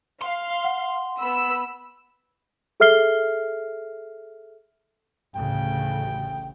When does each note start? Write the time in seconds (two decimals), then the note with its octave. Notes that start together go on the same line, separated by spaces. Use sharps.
0.21 F5 C6
0.65 F#5
1.19 B3 B5 E6
2.80 G#4 A4 E5 F6 C7 G7
5.36 A1 D2 C#3 G5